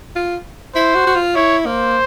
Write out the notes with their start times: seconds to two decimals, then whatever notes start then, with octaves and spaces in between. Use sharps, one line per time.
0.15 F4
0.75 E4 C5
0.95 F#4
1.07 F#4
1.15 F4
1.36 E4 C#5
1.66 A#3 C5